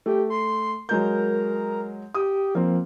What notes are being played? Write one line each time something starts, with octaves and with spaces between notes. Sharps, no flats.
A3 G4
C6
F#3 G#3 A#4 G6
G4 D#6
F3 A#3 C4